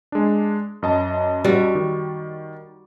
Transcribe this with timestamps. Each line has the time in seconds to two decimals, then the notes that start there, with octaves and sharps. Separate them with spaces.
0.12 G#3 D4
0.83 F#2 D#5 A5
1.44 G3 F#4
1.75 D#3